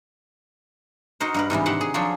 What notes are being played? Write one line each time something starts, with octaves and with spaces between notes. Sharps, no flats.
D#4 F#4 A#4 C5
G2 A#4 B4
G#2 C3 E3 G3
D#3 G4 C5 E5 F#5
G#4
F3 F#3 D4 G#4 C5 C#5